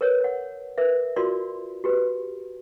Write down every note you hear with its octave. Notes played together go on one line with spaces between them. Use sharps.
A#4 B4 C#5
C#5 F#5
A#4 B4 E5
F4 F#4 A#4 D5 C6
F#4 G4 B4